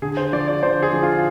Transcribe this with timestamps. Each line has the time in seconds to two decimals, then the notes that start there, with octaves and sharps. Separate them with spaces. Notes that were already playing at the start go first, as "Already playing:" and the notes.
0.02 D3 G#4
0.17 C5
0.33 F3 D5
0.48 D5
0.63 D3 C5
0.83 G#4
0.93 F3
1.03 F4